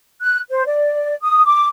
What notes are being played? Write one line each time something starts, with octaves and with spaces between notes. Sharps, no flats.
F#6
C5
D5
D#6
D6